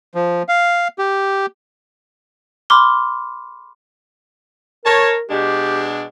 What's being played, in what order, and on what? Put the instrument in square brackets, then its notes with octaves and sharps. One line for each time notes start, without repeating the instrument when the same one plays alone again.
[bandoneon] F3
F5
G4
[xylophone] B5 C6 D6 F6 G7
[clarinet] A#4 [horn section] C#5 A5
[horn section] B2 G#3 D4 [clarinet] G4